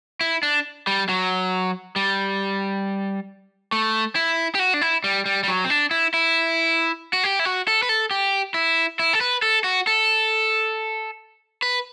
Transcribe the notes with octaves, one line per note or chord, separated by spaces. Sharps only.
E4
D4
G3
F#3
G3
A3
E4
G4
F#4
D4
E4
G3
G3
G3
F#3
C4
D4
E4
E4
F#4
G4
E4
F#4
A4
B4
A4
G4
E4
E4
A4
B4
A4
F#4
A4
B4